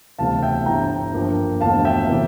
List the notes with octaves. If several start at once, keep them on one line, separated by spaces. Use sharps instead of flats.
E1 D2 C3 E3 G3 F5 A5
E5 G5
G1 G2 E3 G5 A#5
G2 F3 A#3
E1 E2 D3 F3 A3 F5 A5
E5 G5
C3 E3 A#3